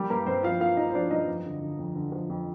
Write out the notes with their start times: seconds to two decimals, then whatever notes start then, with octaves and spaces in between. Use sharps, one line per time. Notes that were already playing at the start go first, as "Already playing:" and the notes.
Already playing: G3 A#3 G4
0.10 G2 A#3 A#4
0.26 G2 C4 C5
0.43 F3 F4 F5
0.60 A#3 F4 F5
0.77 A#3 D#4 D#5
0.90 C5
0.94 F3 D4 D5
1.11 G2 D#4 D#5
1.28 F2
1.46 D3
1.61 D3
1.79 F2
1.96 D3
2.12 F3
2.30 F2